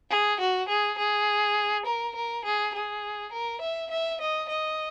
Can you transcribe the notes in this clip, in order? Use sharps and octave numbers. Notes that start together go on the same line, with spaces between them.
G#4
F#4
G#4
G#4
A#4
A#4
G#4
G#4
A#4
E5
E5
D#5
D#5